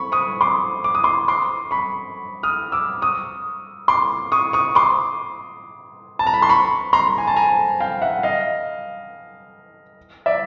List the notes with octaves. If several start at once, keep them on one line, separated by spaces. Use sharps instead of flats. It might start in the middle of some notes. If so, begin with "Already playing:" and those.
Already playing: B5 C#6
C#6 D#6
C6 D6
D6
D#6
C6 D6
C6 D6
B5 C#6
D#6 F6
D6 E6
C#6 D#6
C6 D6
C#6 D#6
C#6 D#6
C6 D6
A5
A#5
B5
C6
B5 C#6
A#5 C6
G#5
A5
G#5 A#5
F5 G5
E5 F#5
D#5 F5
D5 E5